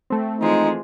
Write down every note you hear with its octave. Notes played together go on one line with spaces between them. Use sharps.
A3 C4
E3 F3 G#3 D#4